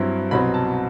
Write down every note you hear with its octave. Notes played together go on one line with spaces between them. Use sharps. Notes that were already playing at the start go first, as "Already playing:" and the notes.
Already playing: G2 F#3 C4 E4
C2 B2 F#3 C4 B5
A5